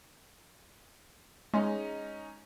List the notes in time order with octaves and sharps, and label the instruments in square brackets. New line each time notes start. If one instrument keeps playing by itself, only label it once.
[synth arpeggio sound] G#3 [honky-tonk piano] C#4 D#4